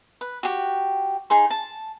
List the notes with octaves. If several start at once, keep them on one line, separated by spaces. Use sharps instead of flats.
B4
F#4 G4
D#4 G#4 C6
A5